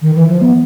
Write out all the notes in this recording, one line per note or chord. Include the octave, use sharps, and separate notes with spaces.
D#3
E3
F3
B3